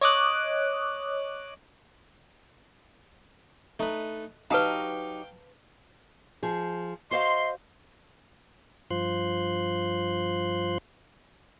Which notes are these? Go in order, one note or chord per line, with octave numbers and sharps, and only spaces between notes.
C#5 D#5 D6 D#6 F#6
A3 D#4 B4
F#3 D#4 G4 B4 F5 G5 A5 A#5
F3 G#4
F#4 C5 D#5 F5 C6
G2 F3 F4 C5 C6 F#6